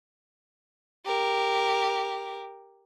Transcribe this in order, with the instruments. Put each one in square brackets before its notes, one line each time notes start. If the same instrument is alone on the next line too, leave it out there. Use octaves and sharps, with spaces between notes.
[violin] G4 A#4